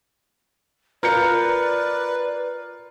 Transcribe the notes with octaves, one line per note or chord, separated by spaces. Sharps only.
F4 A#4 B4 D5 G6 C#7